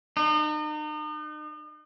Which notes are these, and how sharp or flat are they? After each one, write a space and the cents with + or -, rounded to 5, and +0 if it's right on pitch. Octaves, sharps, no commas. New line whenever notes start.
D#4 -40